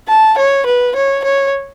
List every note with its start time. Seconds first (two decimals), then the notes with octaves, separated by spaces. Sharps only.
0.08 A5
0.38 C#5
0.66 B4
0.96 C#5
1.24 C#5